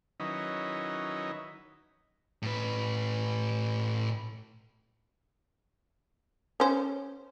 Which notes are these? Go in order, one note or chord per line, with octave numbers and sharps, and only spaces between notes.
D#3 F#3 C#4 D#4 E4 B4
A2 B4
C#4 C5